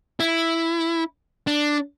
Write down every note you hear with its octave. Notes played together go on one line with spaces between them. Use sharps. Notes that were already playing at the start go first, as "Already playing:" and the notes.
E4
D4